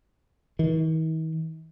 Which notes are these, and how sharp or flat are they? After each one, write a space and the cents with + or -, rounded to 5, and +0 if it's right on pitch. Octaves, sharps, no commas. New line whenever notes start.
D#3 +45